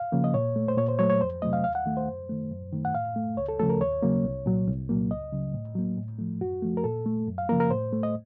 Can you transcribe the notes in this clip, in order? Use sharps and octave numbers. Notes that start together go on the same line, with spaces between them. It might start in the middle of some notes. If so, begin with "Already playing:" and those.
Already playing: F5
C#3 F3 A#3
D#5
A#2 C#5
A3
C5
A#2 C#5
C5
F#3 A3 C#5
C#5
F2 C5
C3 F#3 A3 D#5
F5
D#2 F5
F#5
D#3 A3
C5
F#2
D#3 A3
F#2
D#3 A3
F#5
A2 F5
A3
C#2 C#5
A4
C#3 F3 A3 A4
A#4
D#2 C#5
C#3 F#3 A#3
C2
A#2 F#3
C2
A#2 F#3 A#3
C#2 D#5
C#3 F#3
A2
F#3 A#3
A2
F3 A3
F#2 F#4
F3 A3
A#4
A#2 A4
A3
F#2
F5
C#3 F3 A#3 A#4
A#4
A2 C5
A3
D#5